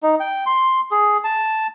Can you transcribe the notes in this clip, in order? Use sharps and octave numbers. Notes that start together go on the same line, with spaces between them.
D#4
G5
C6
G#4
A5